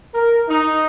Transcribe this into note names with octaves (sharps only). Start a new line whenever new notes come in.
A#4
D#4